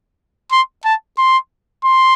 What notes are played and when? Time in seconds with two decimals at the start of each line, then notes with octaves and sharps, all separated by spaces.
0.52 C6
0.85 A5
1.18 C6
1.84 C6